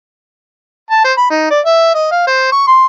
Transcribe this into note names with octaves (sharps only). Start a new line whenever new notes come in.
A5
C5
B5
D#4
D5
E5
D#5
F5
C5
C#6
C6